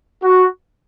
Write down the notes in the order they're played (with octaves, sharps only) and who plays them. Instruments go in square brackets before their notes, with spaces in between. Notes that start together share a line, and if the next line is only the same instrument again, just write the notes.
[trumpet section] F#4